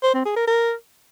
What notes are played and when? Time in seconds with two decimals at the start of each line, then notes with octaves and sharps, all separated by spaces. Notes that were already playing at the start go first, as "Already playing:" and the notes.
0.03 C5
0.14 C4
0.25 G#4
0.36 A#4
0.47 A#4